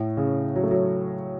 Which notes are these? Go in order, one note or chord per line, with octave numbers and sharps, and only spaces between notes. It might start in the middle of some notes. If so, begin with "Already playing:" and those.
Already playing: A2
C#3
F#3
A3
F#3